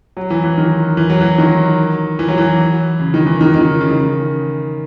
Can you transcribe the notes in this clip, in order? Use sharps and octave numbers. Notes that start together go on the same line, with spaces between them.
F#3
E3
E3
D#3
E3
F#3
E3
D#3
E3
F#3
E3
C#3
D#3
E3
D#3
D#3
C#3
C#3
D#3
C#3